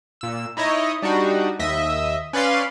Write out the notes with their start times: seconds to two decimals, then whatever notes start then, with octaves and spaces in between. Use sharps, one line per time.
0.21 A#2 E6
0.57 D#4 E4 C#5 D#5
1.02 G3 D4 D#4 F#4
1.59 D#2 D#5 E5
2.33 C#4 B4 D5 F5 C6